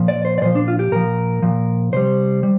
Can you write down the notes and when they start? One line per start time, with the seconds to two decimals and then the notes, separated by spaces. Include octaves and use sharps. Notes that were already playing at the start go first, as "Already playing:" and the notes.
Already playing: A#2 F3
0.08 D5
0.25 C5
0.38 D5
0.42 A#2 F3 C5
0.55 D4
0.68 F4
0.79 G4
0.92 A#2 F3 A#4
1.43 A#2 F3
1.93 C3 G3 C5
2.43 G3